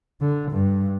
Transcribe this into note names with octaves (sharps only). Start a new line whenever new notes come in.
D3
G2